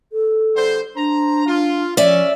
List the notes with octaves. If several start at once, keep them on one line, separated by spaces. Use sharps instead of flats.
A4
D3 G3 C5
D4 C5 A#5
F4
F3 C#4 D5 E5